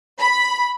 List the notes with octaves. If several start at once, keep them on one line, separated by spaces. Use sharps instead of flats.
B5